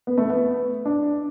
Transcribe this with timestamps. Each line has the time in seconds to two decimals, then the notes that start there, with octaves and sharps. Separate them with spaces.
0.07 B3
0.18 A3
0.29 B3
0.85 D4